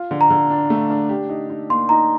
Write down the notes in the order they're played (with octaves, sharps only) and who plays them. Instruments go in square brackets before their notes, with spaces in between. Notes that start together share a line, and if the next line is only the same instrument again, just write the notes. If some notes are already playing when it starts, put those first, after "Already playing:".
Already playing: [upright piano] F4
D3
[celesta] A#5
[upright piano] D3
D4
A3
D4
G4
D#4
D#4
[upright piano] A#3 [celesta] C6
[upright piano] D#4 [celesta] A#5